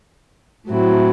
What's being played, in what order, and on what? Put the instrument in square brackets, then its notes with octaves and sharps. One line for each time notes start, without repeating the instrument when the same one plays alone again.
[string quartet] A2 F#3 C4 E4